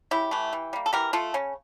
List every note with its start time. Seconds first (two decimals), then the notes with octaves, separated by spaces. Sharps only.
0.11 C#3 E4 G4
0.31 E3 A3
0.53 E3
0.73 G3 A#3
0.86 A4
0.93 E3 G4 A#4
1.13 A3 F4 A4
1.34 C#3 C#4